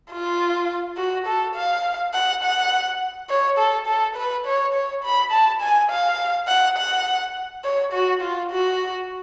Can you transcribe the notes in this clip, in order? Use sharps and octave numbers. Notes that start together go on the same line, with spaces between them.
F4
F#4
A4
F5
F#5
F#5
C#5
A4
A4
B4
C#5
C#5
B5
A5
G#5
F5
F#5
F#5
C#5
F#4
F4
F#4